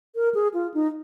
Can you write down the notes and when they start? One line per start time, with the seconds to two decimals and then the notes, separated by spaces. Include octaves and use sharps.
0.16 A#4
0.35 G#4
0.54 F4
0.74 D#4